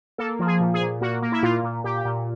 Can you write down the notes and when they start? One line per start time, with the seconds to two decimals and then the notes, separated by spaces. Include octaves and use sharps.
0.18 A#3 A4
0.39 F3
0.47 G#4
0.60 A#2
0.74 G#4
0.82 A#2
1.01 A#3 F#4
1.22 A#3
1.32 E4
1.43 A#2 F4
1.63 A#2
1.84 A#2 G4
2.05 A#2